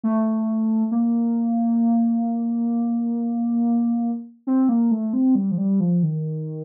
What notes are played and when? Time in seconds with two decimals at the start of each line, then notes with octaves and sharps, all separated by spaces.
0.03 A3
0.91 A#3
4.47 C4
4.69 A#3
4.91 A3
5.13 C4
5.35 G3
5.51 F3
5.58 G3
5.80 F3
6.03 D#3